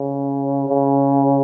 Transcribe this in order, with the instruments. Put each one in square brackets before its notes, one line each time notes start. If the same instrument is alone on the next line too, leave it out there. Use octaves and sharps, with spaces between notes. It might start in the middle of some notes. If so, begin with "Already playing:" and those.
Already playing: [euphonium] C#3
C#3